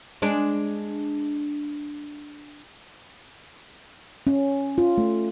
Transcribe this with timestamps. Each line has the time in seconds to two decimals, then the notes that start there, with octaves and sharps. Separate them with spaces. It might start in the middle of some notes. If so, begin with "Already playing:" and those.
0.22 G#3 D4
4.27 C#4
4.78 F4
4.98 A3